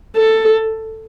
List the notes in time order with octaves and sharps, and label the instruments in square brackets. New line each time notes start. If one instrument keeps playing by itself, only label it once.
[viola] A4